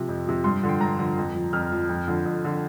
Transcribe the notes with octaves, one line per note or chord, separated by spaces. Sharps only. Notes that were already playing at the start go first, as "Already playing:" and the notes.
Already playing: C3 F3
F2
C3 F3
G2 C6
D3 F3
G5
G2 A#5
D3 F3
F2
F3
F2 F6
F3
F2
D3 F3
F2
D3 F3